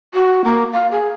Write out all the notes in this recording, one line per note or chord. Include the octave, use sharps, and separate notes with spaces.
F#4
A#3
F5
G#4